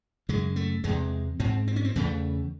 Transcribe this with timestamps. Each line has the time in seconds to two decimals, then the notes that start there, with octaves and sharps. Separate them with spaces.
0.29 F#2 C#3 G#3
0.56 A3
0.84 E2 C3 G#3
1.40 G#2 C4
1.68 C4
1.76 C#4
1.85 C4
1.96 E2 C#3 A3